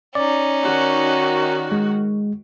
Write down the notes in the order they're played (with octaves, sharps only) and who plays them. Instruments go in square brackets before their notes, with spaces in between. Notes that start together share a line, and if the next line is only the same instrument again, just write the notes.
[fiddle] C#4 D#4 [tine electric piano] D5
[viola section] D#3 F#4
[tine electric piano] G#3